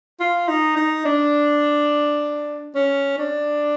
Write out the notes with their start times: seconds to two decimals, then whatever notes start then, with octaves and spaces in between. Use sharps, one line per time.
0.20 F4
0.48 D#4
0.76 D#4
1.05 D4
2.75 C#4
3.18 D4